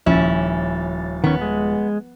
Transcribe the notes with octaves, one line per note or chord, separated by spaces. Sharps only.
D#1 F3 C#4 E4 A6
D#3 B3 C#4
G#3